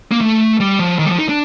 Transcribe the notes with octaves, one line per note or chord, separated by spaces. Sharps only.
A#3
A3
G3
F3
D#3
G3
F3
D#4
D4